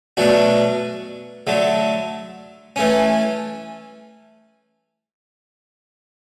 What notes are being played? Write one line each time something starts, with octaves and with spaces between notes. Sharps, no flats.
B2 F#3 A3 D4 F#4
D3 F#3 A3
E3 A3 C#4